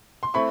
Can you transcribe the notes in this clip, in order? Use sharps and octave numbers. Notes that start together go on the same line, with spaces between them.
C6
A3 C4 E4 B5 C#6